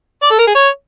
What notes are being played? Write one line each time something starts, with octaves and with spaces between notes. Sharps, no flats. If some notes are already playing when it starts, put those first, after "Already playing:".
D5
A4
A#4
G#4
C#5